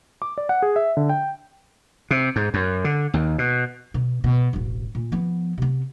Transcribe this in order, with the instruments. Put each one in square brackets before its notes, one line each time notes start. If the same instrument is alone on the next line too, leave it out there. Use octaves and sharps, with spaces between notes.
[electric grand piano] D6
D5
F#5
G#4
E5
D3
G5
[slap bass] C3
G#2
F#2
D3
D#2
B2
[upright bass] B2
B2
E1 A1
A#2
F3 B3
C3 B3